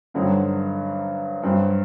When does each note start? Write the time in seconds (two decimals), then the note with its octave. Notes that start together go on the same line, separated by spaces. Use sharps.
0.14 G2 D3 F#3 C4 D#4
1.43 G2 F#3 C4